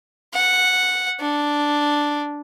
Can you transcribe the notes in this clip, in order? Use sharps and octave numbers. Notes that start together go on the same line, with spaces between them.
F#5
D4